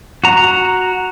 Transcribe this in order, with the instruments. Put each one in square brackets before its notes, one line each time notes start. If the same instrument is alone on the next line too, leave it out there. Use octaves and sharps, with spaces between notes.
[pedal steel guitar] F#4 A#5